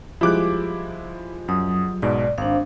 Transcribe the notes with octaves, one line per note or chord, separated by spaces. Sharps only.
F3 G3 G#3 E4 D6 F#6
F#2 F#3 D#6
B1 G#2 B2 D5
G#1 D4 C5 F5